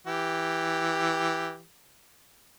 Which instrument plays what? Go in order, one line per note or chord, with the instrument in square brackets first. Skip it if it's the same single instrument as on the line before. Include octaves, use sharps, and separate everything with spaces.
[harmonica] E3 G4